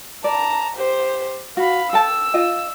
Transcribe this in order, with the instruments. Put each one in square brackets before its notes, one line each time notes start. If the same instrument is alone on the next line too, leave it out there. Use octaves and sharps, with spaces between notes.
[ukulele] D5 [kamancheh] A5 A#5
[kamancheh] G4 C5
[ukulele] F#4 [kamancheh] F5 B5
[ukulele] A4 G5 A5 [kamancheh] E6
[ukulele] F4 D#5 G5